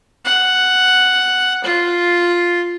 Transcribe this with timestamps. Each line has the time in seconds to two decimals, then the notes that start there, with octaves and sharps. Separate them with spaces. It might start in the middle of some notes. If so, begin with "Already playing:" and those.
0.24 F#5
1.64 F4